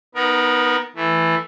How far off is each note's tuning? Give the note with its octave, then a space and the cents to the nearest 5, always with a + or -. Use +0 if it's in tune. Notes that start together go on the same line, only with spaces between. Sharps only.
B3 -5 D#4 +0 A#4 +20
E3 +0 A3 +0